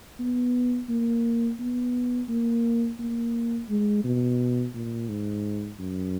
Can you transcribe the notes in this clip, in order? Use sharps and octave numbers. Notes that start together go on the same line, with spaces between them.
B3
A#3
B3
A#3
A#3
G#3
B2
A#2
G#2
F#2